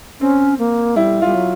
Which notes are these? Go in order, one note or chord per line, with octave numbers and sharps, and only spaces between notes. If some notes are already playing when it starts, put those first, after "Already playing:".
C4 C#4
A#3
G3 E4
F4
G3
F#3